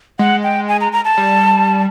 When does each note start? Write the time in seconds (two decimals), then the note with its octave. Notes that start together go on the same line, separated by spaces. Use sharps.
0.19 G#3 F#5
0.43 G5
0.68 G#5
0.81 A#5
0.92 A#5
1.05 A5
1.17 G3